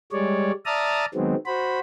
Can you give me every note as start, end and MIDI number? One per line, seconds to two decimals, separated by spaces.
0.12 0.52 55
0.12 0.52 56
0.12 0.52 73
0.12 0.52 74
0.66 1.05 74
0.66 1.05 76
0.66 1.05 81
0.66 1.05 82
0.66 1.05 87
0.66 1.05 89
1.14 1.35 51
1.14 1.35 54
1.14 1.35 56
1.14 1.35 59
1.14 1.35 60
1.46 1.80 66
1.46 1.80 72
1.46 1.80 83